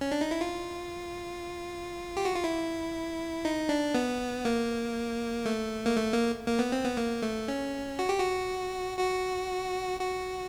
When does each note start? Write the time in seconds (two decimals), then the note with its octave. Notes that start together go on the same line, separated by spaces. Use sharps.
0.01 C#4
0.12 D4
0.21 D#4
0.31 E4
0.41 F4
2.17 G4
2.25 F#4
2.35 F4
2.44 E4
3.45 D#4
3.69 D4
3.95 B3
4.45 A#3
5.45 A3
5.86 A#3
5.96 A3
6.13 A#3
6.47 A#3
6.59 B3
6.72 C4
6.85 B3
6.97 A#3
7.22 A3
7.48 C#4
7.99 F#4
8.09 G4
8.20 F#4
8.99 F#4
10.00 F#4